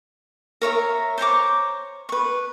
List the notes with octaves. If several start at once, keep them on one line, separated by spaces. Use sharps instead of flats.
A#4 C#5 E5 A#5
C5 C#5 A#5 D6
B4 C#6